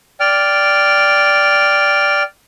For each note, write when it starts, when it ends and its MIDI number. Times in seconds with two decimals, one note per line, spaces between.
0.20 2.23 74
0.20 2.23 79
0.20 2.23 89